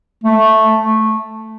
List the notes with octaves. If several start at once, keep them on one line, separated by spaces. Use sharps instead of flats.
A3